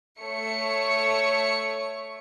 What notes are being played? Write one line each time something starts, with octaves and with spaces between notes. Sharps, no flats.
A3 C#5 C#7